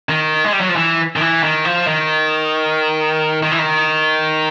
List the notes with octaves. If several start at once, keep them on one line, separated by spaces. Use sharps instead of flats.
D#3
G#3
G3
F#3
F3
E3
D#3
E3
D#3
F3
D#3
D#3
E3
D#3